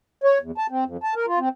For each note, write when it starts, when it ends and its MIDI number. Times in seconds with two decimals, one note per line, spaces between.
0.24 0.38 73
0.42 0.51 40
0.58 0.67 81
0.70 0.84 60
0.85 0.97 41
1.03 1.14 81
1.15 1.26 70
1.27 1.39 65
1.39 1.49 60